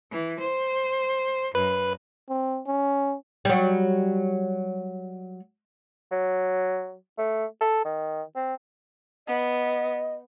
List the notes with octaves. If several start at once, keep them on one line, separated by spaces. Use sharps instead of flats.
E3
C5
F#2 B4
C4
C#4
F#3 G3
F#3
A3
A4
D#3
C4
B3 D#5